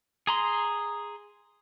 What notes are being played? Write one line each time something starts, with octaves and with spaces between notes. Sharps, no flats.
G#4 A#5 C6